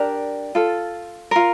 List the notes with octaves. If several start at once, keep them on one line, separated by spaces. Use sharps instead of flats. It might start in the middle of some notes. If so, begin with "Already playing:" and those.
Already playing: D4 G4 A#4 D5
F4 A4
F4 A#4